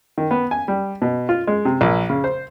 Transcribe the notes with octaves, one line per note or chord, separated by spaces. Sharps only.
D#3
B3
G#5
G3
B2
F4
G#3
C3
A#1
C#3
C5